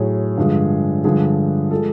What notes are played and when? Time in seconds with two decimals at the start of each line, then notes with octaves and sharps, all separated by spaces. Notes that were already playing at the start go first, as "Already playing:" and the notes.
Already playing: A2 F#3 G#4
0.37 G2 D3 F3 G#3
1.04 G2 D3 F3 G#3 G#4
1.71 F3 G#3 A4